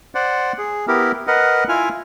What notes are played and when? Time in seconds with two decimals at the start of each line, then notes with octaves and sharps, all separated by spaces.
0.15 C5 D5 F#5
0.58 G#4
0.88 B3 E4 G4 A#4
1.27 A#4 B4 D#5 F#5
1.69 E4 F4 G#5 F6